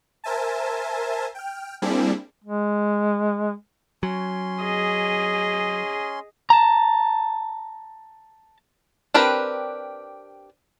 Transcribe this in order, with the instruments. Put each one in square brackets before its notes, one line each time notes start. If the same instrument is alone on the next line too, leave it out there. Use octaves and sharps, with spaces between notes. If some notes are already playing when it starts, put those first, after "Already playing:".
[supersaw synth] A#4 C5 E5 G#5 A5
G5 F6
G3 A#3 C4 D4 E4 G#4
[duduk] G#3
[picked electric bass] F#3 [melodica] C#4 C6
[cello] G#4 [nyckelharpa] D#5
[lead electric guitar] A5 A#5
[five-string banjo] C4 D4 G4 A#4 B4